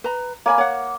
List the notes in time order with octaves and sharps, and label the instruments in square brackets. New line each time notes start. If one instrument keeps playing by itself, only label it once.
[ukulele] B4 A#5
[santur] A#3 [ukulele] C#5 G#5 B5
[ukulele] C#5 F#5